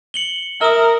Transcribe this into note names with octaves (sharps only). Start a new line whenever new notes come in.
C#7 F#7 G7
A#4 E5 D#6 F6